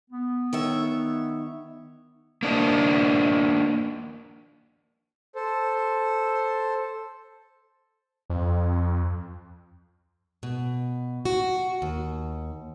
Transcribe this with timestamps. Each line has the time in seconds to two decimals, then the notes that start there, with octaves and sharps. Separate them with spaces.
0.10 B3
0.53 D#3 C#5 E5
2.43 A#3 D4 D#4
5.35 A4 C5
8.30 F2
10.43 B2
11.25 F#4
11.82 D#2